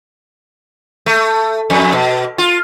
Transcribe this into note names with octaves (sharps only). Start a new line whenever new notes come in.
A3
F2
B2
F4